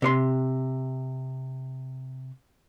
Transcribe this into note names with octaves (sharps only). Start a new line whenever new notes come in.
C3 C#5 C6